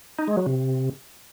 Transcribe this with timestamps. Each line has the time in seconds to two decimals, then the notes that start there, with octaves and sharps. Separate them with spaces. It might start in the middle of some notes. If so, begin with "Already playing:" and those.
0.19 D#4
0.28 G#3
0.37 F#3
0.46 C3